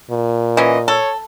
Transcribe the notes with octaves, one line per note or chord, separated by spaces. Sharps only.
A#2
E3 C#4 D#5
A4 C#5